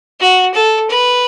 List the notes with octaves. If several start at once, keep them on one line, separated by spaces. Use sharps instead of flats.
F#4
A4
B4